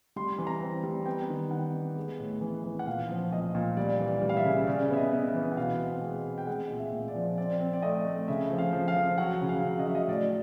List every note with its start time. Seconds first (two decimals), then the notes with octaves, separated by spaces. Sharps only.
0.16 G3 C6
0.38 E3
0.47 A#5
0.61 C4
0.83 G3
1.06 B3 G5
1.29 D#3
1.51 D#3 F#5
1.74 B3
1.96 G#3
2.20 A2
2.41 E3
2.64 E3
2.79 F#5
2.86 A#2 F5
3.09 F3
3.31 A#2 D#5
3.55 A#2
3.77 G3 D5
4.00 E3
4.07 D5
4.22 G3
4.29 F5
4.37 E5
4.45 C#3
4.67 C#3 D5
4.90 B3 E5
4.97 D#5
5.13 B3
5.28 E5
5.35 E3
5.52 F#5
5.57 B2 F5
5.80 C4
6.02 G#3
6.25 C4
6.38 G5
6.47 G#3 F#5
6.70 A#2
6.77 E5
6.92 A#2
7.08 D5
7.15 F3
7.38 C4 D5
7.60 C4
7.73 D5
7.82 A3 D#5
8.05 A3
8.28 C#3 E5
8.50 F3
8.58 F5
8.73 F3
8.88 F5
8.96 F3
9.18 F#3 F#5
9.41 C#3
9.49 F5
9.63 C#3
9.79 D#5
9.87 F#3 E5
9.95 D#5
10.08 A2 D5